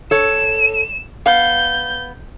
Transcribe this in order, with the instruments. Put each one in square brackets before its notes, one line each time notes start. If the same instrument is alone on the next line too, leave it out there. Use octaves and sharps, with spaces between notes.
[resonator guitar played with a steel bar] A4 C#5 [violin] E7
[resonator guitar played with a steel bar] B3 F5 [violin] G6